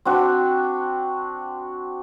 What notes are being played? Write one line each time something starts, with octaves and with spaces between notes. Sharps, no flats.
C4 D4 F#4